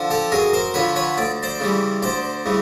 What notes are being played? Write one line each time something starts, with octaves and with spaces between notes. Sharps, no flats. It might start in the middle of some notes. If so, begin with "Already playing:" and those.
Already playing: D3 F3
G4 A4
F#2 G#4 A#4
A#4 C5
D3 F3 B4 C#5
B4 C#5
D2 D5
C5 D5
C#3 E3 G3
D2 C5 D5
C#3 E3 G3